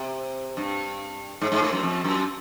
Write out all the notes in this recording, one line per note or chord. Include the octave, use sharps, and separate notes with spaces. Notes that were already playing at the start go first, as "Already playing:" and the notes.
Already playing: C3
G2
G#2
G#2
A2
F#2
F2
F#2